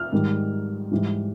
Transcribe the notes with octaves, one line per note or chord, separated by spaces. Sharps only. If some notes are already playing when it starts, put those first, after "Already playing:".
Already playing: F6
G#2 D#3 G3
G#2 E3 G3